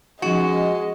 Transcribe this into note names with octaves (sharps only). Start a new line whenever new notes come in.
F3 G#3 C#4 D#4 F#4 D#5